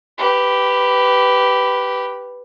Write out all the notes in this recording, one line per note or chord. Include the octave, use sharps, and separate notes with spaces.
G4 B4